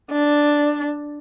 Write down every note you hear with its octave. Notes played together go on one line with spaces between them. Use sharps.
D4